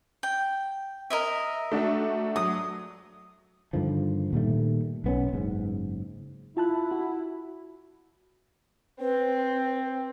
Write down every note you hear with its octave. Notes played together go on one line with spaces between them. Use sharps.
G5
A#4 D#5 E5
A3 D4 F#4
F#3 D#6
G2 D3 D#3 F3
A#2 D#3 G3 A3
B1 B3 C#4
F#1 G#2
E4 F4 A5 F#6
F#4
C4 B4